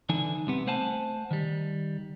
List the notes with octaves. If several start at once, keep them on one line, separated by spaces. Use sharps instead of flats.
D3 E3 D4 D#4 G#5
C2 C3 B3
A3 C5 F#5 G#5 A5
D#3 G3